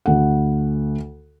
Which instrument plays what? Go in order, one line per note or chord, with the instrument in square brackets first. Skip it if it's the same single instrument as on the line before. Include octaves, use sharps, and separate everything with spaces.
[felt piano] D2 F#5